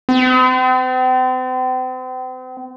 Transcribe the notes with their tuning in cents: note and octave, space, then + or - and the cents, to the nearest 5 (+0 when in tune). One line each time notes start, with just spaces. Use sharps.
C4 -40